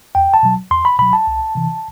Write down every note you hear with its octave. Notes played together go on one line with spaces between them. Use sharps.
E2 G5
A5
B2 F#3
E2 C6
B5
B2 F#3 B5
A5
C2
C3 E3